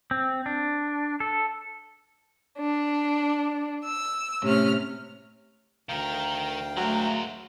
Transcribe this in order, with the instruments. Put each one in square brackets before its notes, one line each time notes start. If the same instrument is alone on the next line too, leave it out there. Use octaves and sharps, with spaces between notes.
[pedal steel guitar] C4
D4
A4
[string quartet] D4
E6
A2 C3 C#4 F6
[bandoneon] D2 F5 G5 [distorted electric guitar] D#3 A#4
[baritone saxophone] F#3 [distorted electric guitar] G#3 A#4 [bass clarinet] A3